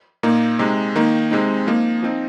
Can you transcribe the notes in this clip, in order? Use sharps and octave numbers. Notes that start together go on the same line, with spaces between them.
A#2 A#3 D#4
C3 G#3 D#4
D#3 A#3 D#4
C3 G#3 C4 D#4
F3 A#3 D#4
F3 C4 D#4